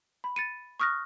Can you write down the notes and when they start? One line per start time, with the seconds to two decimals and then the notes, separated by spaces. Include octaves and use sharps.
0.24 B5
0.36 A6 C#7 D#7
0.80 C#6 D#6 F6 F#6 A#6